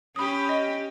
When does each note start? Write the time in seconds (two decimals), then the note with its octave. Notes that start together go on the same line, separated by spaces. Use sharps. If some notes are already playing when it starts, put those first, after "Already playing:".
0.16 C#4 G4 B5 D#6
0.49 D#5